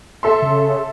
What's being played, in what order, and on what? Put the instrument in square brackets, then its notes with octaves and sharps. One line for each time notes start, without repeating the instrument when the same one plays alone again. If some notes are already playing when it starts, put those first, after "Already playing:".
[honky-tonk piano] A4 E5 C6
[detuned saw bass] C#3